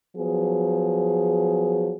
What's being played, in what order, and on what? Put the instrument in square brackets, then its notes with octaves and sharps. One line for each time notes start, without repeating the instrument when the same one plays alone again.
[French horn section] F3 F#3 B3 G#4